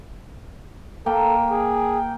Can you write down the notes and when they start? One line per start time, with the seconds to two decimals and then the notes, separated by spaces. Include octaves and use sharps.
1.06 A#3 A4 G5
1.51 G#4